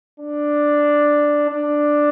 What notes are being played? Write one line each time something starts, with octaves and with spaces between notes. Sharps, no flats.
D4
D4